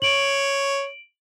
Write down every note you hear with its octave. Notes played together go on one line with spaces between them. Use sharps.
C#5 D7 F#7